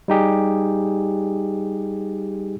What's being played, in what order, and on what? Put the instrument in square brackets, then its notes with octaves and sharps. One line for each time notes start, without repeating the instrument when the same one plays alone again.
[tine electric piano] G3 D#4 G4 G#4